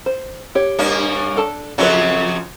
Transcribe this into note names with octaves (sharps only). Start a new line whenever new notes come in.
C5
G4 C#5
G2 A#3 C#4
D4 A4 A5
F2 C#3 F#3 C#4 F4 B4